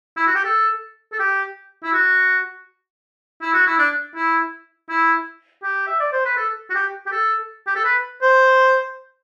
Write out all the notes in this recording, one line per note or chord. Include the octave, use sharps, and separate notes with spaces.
E4
F#4
G4
A4
A4
G4
E4
F#4
E4
F#4
E4
D4
E4
E4
G4
E5
D5
C5
B4
A4
F#4
G4
G4
A4
G4
A4
B4
C5